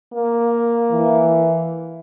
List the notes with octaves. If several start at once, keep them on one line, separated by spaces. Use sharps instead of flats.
A#3
E3